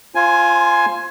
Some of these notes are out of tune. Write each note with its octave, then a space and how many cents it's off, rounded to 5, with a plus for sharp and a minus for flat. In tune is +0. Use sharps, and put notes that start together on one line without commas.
F4 -10 C5 +20 G#5 +10